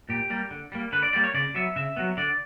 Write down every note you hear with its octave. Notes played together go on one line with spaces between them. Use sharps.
A#2 G4
G3 A#3
D3
G3 A#3
D3 B4
D5
G3 A#3 D5
C#5
C#3 D5
F#3 B3 E5
C#3 E5
F#3 B3
D3 D5